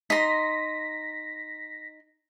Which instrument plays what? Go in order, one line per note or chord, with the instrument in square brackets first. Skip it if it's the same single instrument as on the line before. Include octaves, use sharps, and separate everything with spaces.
[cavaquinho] D#4 C6 [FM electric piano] A#6 B6